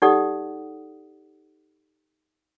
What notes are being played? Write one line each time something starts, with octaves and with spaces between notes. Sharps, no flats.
D#4 G4 A4 D5 F#5 D#6